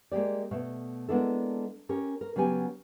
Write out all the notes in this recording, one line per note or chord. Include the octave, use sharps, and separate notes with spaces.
G#3 A#3 G4 D5
B2 A3 F5
G#3 A#3 B3 D4 E4 A4
C#4 G4 A#4
A#4
C#3 F#3 B3 G4 G#5